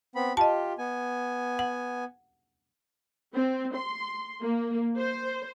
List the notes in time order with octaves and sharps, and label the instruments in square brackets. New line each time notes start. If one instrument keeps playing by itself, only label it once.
[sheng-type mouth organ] B3 C4 B5
[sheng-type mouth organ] F4 G4 [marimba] D#5 A5
[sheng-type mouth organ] B3 G#5
[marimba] F#5
[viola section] C4
C6
A#3
C5